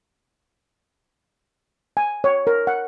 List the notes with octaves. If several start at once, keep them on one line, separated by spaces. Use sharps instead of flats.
G#5
C#5
A#4
F#5